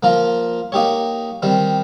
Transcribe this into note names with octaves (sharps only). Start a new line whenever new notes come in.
F3 A#3 F4 A#4
A#3 D#4 G4 C#5
D#3 G3 C4